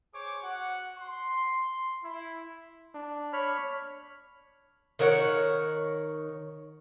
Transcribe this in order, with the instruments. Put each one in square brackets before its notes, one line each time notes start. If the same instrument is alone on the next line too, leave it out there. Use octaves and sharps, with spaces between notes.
[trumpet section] G#4 C5 C#5 C#6 D6
F#4 F#5
C6
E4
[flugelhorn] D4
[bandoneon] C#5 B5 F6
[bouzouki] D#3 A#4 C#5 F#5